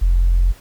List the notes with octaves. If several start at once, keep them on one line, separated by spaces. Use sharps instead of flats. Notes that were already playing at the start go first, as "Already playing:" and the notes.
F1